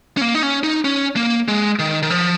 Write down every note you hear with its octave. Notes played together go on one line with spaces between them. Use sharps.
C#4
A#3
D#4
C#4
D#4
C#4
A#3
G#3
D#3
D#3
F3